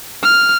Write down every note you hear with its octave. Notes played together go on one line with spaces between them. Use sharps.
F6